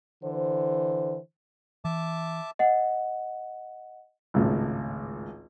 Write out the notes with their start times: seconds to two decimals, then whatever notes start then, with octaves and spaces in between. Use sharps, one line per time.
0.24 D3 E3 C5
1.85 E3 E5 A5 D6
2.59 D#5 F#5
4.34 G#1 C#2 A2